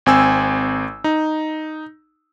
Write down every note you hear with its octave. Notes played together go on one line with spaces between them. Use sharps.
G#1 C4 G#5 E6
D#4